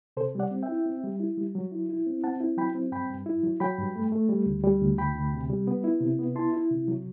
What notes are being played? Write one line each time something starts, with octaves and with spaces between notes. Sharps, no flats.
C3 A4 C5
G3 D5 F#5
C4
E5 G5
E4
C4
G3
E4
G3
F#3
E4
E4
C4
C4 F#5 A5
E4
F#3 G5 B5
C4
G2 G5 B5
G2
E4
F#3
F#3 G5 B5
G2
A3
A3
G3
D2
G3
D2
D2 G5 B5
D2
C3
G3
B3
E4
C3
B3
E4 A5 C6
E4
C3
F#3